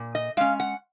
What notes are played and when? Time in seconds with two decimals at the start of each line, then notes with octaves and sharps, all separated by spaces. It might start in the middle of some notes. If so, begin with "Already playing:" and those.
Already playing: A#2
0.15 D#5
0.37 G#3 C#4 F5
0.60 F#5